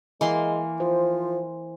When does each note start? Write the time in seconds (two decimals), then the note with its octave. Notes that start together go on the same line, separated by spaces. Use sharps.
0.21 E3 G#3 A#3 C6
0.80 F3 C5